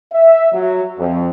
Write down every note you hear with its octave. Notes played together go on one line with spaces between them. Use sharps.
E5
F#3
F2